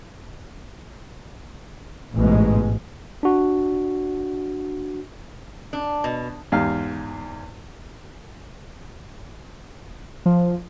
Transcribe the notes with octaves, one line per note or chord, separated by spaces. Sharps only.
A1 G#2 B2 G#3
D4 F#4
D4
B2
E2 G#2 G4 F5
F3